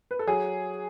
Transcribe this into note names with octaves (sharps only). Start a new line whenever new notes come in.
B4
A4
F#3 G#4